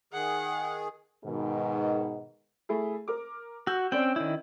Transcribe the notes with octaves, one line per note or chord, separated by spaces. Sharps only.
D#3 G#4 F#5
G#2 B2 D#3
A3 E4 G#4
A#4 D6
F#4 E6 G6 F#7
C4 C#4 D5 G5 F#7
D#3 E4